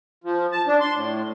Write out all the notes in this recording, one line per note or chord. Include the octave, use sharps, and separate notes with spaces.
F3
A5
D4
C6
A2